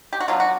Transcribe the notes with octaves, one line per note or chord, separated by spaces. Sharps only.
G4
F#4
D3 F#3 B3 D4 F4
F#4